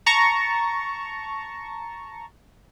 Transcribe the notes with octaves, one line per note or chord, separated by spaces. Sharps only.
A5 A#5 C#6